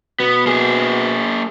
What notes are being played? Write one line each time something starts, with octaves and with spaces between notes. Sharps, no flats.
B2 B3
A#3 G#4